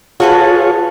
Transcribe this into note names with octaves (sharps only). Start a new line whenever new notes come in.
F4 F#4 G#4 A4 B4 C#5